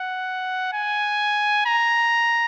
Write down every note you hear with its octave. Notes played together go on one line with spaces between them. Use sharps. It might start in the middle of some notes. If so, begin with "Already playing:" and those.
Already playing: F#5
G#5
A#5